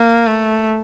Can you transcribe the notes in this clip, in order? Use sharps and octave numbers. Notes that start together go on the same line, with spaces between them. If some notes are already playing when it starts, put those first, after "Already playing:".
Already playing: A#3
A3